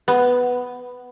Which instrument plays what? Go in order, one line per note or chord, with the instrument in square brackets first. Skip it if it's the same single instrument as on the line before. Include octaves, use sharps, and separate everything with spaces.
[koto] B3